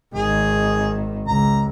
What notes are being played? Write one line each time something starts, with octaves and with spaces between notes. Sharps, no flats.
G#1 D#3 G#4
C#2 A#5